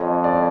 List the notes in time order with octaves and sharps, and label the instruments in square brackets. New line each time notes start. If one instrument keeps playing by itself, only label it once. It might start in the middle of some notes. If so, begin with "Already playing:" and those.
Already playing: [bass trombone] F2 [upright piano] C#5 D#5
[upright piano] D5